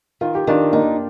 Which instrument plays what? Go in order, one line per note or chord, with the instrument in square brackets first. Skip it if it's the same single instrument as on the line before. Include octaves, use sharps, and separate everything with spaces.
[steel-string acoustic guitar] D#3 [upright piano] F4
[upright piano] G4
[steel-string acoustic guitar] D#3 [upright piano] D4 F4
[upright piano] A#3 D4 [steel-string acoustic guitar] D#4